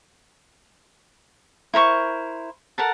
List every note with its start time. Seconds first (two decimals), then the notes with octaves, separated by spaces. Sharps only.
1.74 E4 A#4 C5 C#6
2.78 A4 A#4 F#5 A5